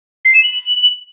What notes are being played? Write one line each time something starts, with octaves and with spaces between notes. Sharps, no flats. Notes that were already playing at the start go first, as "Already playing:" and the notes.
C7
E7
F#7